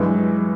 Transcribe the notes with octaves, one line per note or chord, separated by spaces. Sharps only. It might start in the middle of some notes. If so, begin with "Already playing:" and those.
Already playing: G2 E3 F#3 G#3